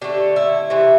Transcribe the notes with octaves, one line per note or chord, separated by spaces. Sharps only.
D3 A3 G4
E4
C3 E3 A3